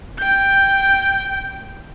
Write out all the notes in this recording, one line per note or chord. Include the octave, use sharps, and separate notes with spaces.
G5 G6